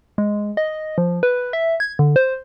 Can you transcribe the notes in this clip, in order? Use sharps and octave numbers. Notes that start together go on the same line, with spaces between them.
G#3
D#5
F3
B4
E5
G#6
D3
C5